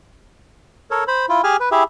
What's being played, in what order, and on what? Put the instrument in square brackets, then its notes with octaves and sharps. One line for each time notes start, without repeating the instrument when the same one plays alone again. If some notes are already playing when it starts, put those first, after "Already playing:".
[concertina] A4 A#4 C#5
C5 B5
E4 F4
G4 G#4 G#5 F6
B4
E4 G4 G#4 E5